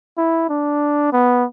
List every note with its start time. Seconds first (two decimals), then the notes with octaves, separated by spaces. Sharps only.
0.17 E4
0.49 D4
1.12 B3